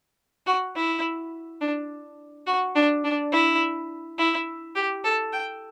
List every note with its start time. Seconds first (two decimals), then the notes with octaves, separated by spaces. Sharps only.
0.47 F#4
0.75 E4
1.61 D4
2.47 F#4
2.76 D4
3.04 D4
3.32 E4
4.18 E4
4.76 G4
5.04 A4
5.33 G5